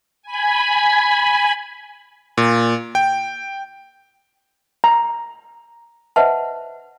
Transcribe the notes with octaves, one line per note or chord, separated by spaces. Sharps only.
G#5 B5
A#2
G5
A#5
B4 C5 D#5 E5 F#5 A5